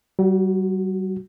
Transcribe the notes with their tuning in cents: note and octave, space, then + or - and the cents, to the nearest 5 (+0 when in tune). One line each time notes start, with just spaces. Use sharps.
G3 -40 F#4 +0